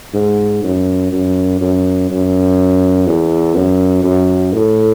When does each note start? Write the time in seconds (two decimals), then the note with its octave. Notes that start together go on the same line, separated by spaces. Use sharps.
0.14 G#2
0.64 F#2
1.12 F#2
1.61 F#2
2.10 F#2
3.07 E2
3.55 F#2
4.04 F#2
4.53 A2